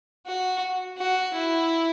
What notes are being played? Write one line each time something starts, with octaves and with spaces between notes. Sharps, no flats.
F#4
F#4
E4